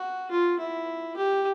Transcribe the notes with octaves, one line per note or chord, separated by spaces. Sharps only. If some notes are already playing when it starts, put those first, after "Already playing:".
Already playing: F#4
F4
E4
G4